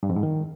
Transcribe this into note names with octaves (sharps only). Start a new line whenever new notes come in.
G2
F2
G#2
D#3